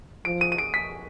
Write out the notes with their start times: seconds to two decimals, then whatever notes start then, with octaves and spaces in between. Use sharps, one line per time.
0.25 F3 D7
0.41 D#7
0.52 D#7
0.58 D7
0.74 B6